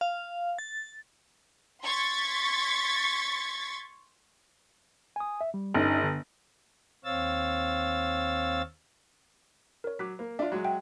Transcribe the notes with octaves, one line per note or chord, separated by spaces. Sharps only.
F5
A6
C6 C#6 G#6 A6 B6
G#5 D#6
E5
G3
G1 C#4 D#4
D3
D#2 C4 C#5 F5 E6 A6
A#4 C#5
F#3 D6 F#6 B6
A#3
D4 F4 E5 C6
F#3 G#3
E5 F#5 G5